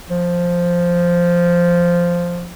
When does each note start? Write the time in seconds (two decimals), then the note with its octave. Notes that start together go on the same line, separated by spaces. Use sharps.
0.11 F3